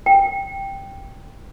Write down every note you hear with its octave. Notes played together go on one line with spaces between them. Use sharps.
G5